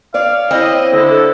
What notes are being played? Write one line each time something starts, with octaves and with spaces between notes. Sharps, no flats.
C#5 D5 F5
C4 E4 D#5
D3 E4 A4